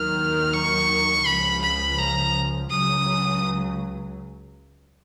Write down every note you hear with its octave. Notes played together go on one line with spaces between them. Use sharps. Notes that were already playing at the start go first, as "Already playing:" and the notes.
Already playing: D#2 D#3 F#3 F6
C#6
C#2 C#3 F3 B5
B5
A#5
C#2 C#3 F#3 D#6